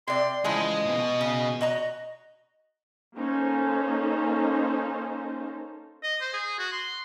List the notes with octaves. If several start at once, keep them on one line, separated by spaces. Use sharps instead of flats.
C3 D5 C6
C#3 E3 F3 G#3 D#5
B2
C#3
F#4 D#5 A#5
A#3 C#4 D#4 A4 C5
D#5
C5
G#4
F#4
C6